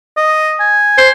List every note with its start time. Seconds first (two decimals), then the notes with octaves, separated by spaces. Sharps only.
0.17 D#5
0.59 G#5
0.98 C5